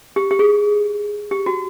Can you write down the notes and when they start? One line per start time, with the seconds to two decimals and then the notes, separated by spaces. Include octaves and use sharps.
0.16 G4
0.31 G4
0.39 G#4
1.31 G4
1.46 F#4